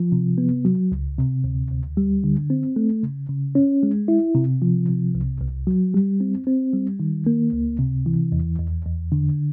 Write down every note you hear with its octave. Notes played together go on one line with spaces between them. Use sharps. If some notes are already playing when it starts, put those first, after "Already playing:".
Already playing: F3
C3
B3
F#3
C#2
C3
D2
D2
G3
D3
C4
A3
C#3
C#3
C#4
G#3
E4
C3
F3
C3
C2
C2
F#3
G3
C4
C4
G3
D#3
A#3
C#2
C3
E3
E2
E2
E2
D3